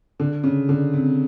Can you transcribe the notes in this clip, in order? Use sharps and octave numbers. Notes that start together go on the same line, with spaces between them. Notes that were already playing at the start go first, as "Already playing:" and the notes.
D3
C#3
D3
C3